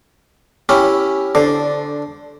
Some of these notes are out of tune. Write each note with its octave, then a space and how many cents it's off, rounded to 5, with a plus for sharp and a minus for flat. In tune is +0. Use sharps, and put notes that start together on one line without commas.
C#4 +0 E4 +0 G4 +0
D3 -10 D4 +0 C5 +0